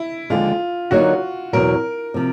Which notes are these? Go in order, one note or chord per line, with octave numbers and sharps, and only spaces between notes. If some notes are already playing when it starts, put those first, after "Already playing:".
Already playing: E4
D#2 D3 F3 G#3 F4
D3 F#3 A#3 D#4 F#4
E2 B2 F#3 A#4
C3 F3